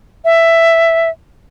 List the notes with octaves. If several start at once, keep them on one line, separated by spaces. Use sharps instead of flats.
E5